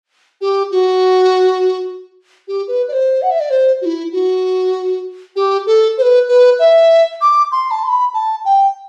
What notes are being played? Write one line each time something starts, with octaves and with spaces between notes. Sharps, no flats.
G4
F#4
G4
B4
D5
C5
F#5
E5
D5
C5
F#4
E4
F#4
G4
A4
C5
B4
B4
E5
D6
C6
A5
C6
B5
A5
G5